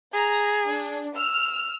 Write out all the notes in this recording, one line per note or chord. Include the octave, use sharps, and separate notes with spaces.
G#4 A#5
D4
E6 F6